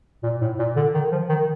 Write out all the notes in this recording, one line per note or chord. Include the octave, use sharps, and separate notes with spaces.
A#2
A2
A#2
D3
D#3
F3
D#3